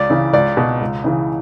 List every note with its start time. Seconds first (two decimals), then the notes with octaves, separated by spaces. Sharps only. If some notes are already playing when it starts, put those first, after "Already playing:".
Already playing: C#2 D5
0.10 C#3 E3
0.33 C#2 D5
0.57 B2
0.81 C#2
1.04 C#3 E3